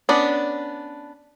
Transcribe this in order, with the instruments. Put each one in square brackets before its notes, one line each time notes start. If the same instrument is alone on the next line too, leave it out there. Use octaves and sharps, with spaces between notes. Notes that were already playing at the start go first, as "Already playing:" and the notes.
[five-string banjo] B3 C#4 D4